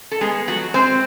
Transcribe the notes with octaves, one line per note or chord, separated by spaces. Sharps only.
A4
G#3 B3 G#4
F3 F#3 F#4
G#3 C4 C5